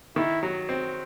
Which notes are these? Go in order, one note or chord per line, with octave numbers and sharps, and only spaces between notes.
D#3 E4
F#3
C4